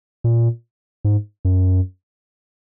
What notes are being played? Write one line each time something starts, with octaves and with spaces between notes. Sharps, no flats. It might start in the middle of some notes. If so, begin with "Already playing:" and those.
A#2
G#2
F#2